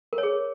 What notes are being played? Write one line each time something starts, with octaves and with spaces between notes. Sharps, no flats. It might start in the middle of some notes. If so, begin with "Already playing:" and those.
A#4
C#5
G#4